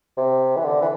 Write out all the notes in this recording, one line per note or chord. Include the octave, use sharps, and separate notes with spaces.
C3
E3
D3
E3